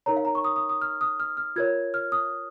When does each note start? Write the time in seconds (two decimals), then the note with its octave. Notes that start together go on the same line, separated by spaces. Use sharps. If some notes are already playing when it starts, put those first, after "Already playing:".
0.06 D#4 A#4 C#5 A#5
0.16 F5
0.25 A#5
0.35 C#6
0.45 D#6
0.56 D#6
0.69 D#6
0.82 F6
1.01 D#6
1.20 F6
1.37 F6
1.56 F4 A#4 C#5 G#6
1.94 F6
2.12 D#6